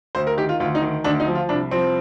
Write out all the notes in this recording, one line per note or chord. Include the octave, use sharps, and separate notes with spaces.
D2 C5
A#4
D#3 G4
F4
D2 F4
D#4
D#3
D2 D4
D#4
F3
F4
C2 D4
F3 C4